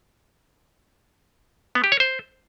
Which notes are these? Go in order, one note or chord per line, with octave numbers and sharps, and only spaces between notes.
B3
G4
C#5
C5